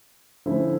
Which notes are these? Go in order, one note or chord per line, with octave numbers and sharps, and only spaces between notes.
D3 F3 A3 C#4 E4